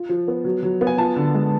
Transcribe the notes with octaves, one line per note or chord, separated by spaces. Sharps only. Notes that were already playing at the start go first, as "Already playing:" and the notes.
Already playing: F4
F3
B3
F#3
F#3
B3
G#5
F4 A5
D3
G#3